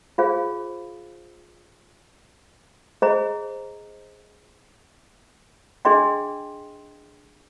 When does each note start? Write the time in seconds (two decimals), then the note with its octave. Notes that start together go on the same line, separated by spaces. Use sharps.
0.18 F4 G#4 C5 F5
3.02 G#4 C5 D#5 A#5
5.85 D4 G#4 D#5 G5 C6